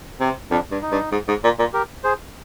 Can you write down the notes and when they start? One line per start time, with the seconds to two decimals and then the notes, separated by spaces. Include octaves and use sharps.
0.20 C3 C4
0.51 F2 D4
0.71 G2
0.82 D#4
0.92 G2
1.12 G#2
1.28 G#2
1.44 A#2
1.59 A#2
1.73 G4 A#4
2.04 G#4 C5